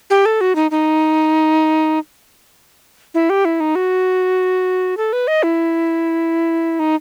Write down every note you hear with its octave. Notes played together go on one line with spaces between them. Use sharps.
G4
A4
F#4
D#4
D#4
E4
G4
E4
D#4
F#4
A4
B4
D#5
E4
D#4